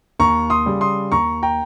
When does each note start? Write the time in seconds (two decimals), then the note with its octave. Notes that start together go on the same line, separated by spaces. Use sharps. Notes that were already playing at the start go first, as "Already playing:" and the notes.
0.19 D#2 A#5 C#6
0.50 C6 D#6
0.66 C#3 G3
0.81 C6 D#6
1.12 D#2 A#5 C#6
1.43 G5 A#5